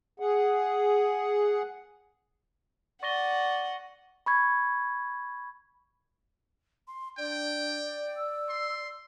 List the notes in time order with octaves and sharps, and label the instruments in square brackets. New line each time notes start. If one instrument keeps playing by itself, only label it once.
[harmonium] G#4 F#5
[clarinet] D5 [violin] F#5 [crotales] C#6 A#6 G7
[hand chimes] B5 C#6 G#6
[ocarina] C6
[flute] D4 [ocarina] D5 [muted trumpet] G5
[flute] E6
[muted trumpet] C6